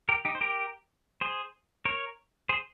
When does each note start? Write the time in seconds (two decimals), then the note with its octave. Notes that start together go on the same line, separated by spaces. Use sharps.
0.09 G4 A#4
0.25 D#4 G4
0.35 C5
0.41 G4 A#4
1.21 G#4 C5
1.85 A#4 C#5
2.49 G#4 C5